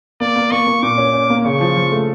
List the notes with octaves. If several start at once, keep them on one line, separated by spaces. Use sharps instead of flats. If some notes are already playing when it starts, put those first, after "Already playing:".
A#3 D5
A#3
A#3 C#6
A#3
A#2 D6
C#4
C#4
A#3
C#3 C#6
F3
F3
A3